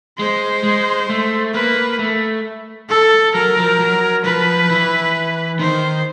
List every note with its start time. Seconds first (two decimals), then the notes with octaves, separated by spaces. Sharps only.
0.19 G#3 C5
0.63 G#3
1.10 A3
1.54 A#3 B4
1.99 A3
2.89 A4
3.35 F#3 A#4
3.57 F3
3.80 F#3
4.25 F3 B4
4.70 E3
5.60 D#3 C5